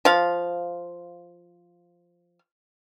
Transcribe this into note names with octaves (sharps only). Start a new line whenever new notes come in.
F3 F5